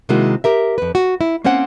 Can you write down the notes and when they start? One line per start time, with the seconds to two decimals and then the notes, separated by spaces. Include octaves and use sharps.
0.09 C3 D#3 G#3 A#3 E4 F#4
0.44 G4 A#4 E5
0.78 F2 B4
0.95 F#4
1.21 E4
1.44 A#3 C4 C#4 C5 F#5